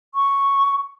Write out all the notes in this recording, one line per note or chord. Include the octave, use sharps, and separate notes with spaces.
C#6